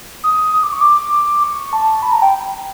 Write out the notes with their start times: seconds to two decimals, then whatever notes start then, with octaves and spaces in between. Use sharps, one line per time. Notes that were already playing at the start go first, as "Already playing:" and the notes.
0.24 D#6
0.53 D#6
0.63 D6
0.72 C#6
0.81 D6
1.43 C#6
1.73 A5
2.02 B5
2.12 A#5
2.22 G5